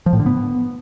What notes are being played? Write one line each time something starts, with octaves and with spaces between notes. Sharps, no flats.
F3
A2
D3
B3